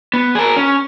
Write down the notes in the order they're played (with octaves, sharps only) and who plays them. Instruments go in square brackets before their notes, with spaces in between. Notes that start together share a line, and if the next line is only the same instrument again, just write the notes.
[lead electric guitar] B3
G#4 A#4
C#4